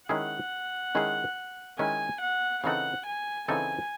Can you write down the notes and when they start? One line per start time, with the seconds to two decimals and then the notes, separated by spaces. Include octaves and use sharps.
0.09 D#3 G#3 C#4 E4 G#4 F#5
0.95 D#3 G#3 C#4 E4 G#4
1.79 D#3 G#3 C#4 E4 G#4 G#5
2.21 F#5
2.64 C#3 E3 C4 D#4 A4 F#5
3.06 G#5
3.48 C#3 E3 C4 D#4 A4 G#5